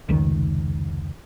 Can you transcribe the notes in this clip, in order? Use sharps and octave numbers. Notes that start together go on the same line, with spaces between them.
F1 C#2 D#3